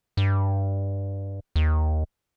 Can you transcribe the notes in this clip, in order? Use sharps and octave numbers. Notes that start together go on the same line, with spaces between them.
G2
D#2